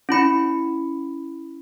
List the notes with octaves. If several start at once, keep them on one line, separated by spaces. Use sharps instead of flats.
C#4 E4 B5 C#7